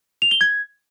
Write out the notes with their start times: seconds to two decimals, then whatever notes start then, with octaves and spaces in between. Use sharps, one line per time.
0.22 F7
0.31 G7
0.41 G#6